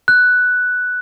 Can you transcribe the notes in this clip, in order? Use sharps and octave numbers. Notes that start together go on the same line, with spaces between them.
F#6